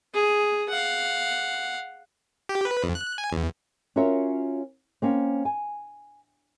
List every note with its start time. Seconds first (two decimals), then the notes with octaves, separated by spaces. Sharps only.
0.14 G#4
0.69 F5 F#5
2.49 G4
2.65 B4
2.83 F2
2.95 F#6
3.18 G#5
3.32 E2
3.96 C#4 F4 F#4 A#4 C#5 E5
5.02 A#3 C4 C#4
5.45 G#5